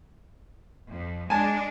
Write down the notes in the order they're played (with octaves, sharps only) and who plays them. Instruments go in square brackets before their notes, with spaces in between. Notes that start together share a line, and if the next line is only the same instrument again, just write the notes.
[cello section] F2
[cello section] G#3 D4 [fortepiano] G#5 A5